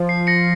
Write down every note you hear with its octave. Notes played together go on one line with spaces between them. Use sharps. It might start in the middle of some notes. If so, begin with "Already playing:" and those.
Already playing: F3
C7
A#6 C#7